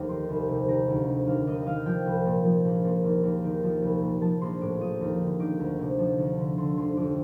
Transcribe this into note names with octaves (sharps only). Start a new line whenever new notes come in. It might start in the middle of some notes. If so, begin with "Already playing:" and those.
Already playing: F1 D#2
D#3 C6
C2
C3
D#3 A#5
D2
C3
D#2 F5
D#2 D#5
D#5
D#3 F5
F3 G5
C2
A#2
F3
A#1
A#2
D#2
D#2
D#3
F3
C2
A#2
F3 A5
A#1 C6
A2 D6
F3 D#6
D#2
D3
D#3 D6
D2
C3
F3
D2
D3
D3 C6
F1 C6
F2 D6